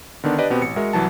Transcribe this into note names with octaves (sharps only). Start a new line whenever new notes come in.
D3 D#3 B3 D4
D4 G4 B4 D5 D#5
B2 B3 C4 G4
A1 C#7
G#3 F#4 A#4 E5
C2 E3 F#3 A5